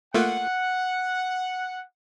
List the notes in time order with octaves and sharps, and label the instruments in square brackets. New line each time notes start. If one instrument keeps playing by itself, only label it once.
[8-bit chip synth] A3 A#3 F4 [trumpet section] F#5